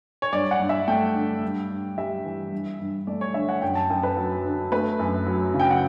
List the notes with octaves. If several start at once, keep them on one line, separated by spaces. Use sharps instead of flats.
C#5
G2 D5
F#5
G2
E5
A3 G5
D3
G2
G2
G3 E5
E3
G2
G2
A3 D5
C#5
D3 E5
F#5
F#2 G5
A5
F#2 G5
B4
F#3
D3
A3 B4
F#2
F#3
C#3
G5
F#5